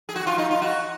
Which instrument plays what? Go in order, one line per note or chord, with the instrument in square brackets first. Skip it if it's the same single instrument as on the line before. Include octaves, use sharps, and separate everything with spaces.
[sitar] G#4
F#4
F4
D#4
F4
F#4